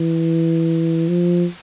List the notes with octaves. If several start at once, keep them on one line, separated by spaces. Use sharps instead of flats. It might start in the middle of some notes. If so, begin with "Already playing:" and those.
Already playing: E3
F3